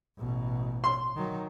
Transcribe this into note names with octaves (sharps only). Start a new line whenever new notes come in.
A1 B2
C6
D#3 F#3